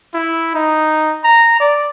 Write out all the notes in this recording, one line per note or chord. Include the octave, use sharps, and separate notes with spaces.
E4
D#4
A#5
D5